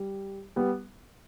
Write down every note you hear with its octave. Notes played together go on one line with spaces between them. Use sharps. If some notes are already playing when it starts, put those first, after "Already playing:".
Already playing: G3
G3 B3